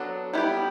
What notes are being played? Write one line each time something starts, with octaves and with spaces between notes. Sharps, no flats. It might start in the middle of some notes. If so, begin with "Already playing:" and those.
Already playing: F#3 B3 D4 F#4 A4
G3 B3 E4 G4